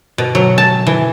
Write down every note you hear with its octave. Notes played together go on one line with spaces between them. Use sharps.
B2
F#3
A5
E3